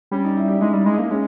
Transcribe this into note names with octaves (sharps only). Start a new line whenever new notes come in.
G3 C#4
D#4
E4
G4
G#3 D#4
G3 E4
G#3
D#4
A#3
D#4
G#3 C#4